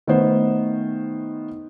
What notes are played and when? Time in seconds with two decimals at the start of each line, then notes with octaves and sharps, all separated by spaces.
0.07 D#3 A3 B3 C5